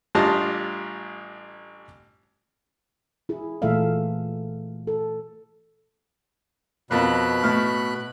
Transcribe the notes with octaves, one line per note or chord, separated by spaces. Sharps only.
A1 G3 D4 F4 D#5 A5
E4 G#4
A#2 E3 A3 A4 E5 F5
A4
F2 B2 A#3 B5 F#6
A2 F6